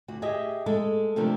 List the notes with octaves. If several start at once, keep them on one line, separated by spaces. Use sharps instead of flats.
D2 F#4
G4 G#4 D#5 E5 G#5
G#3 A4
C3 F3 A3 A#3 D4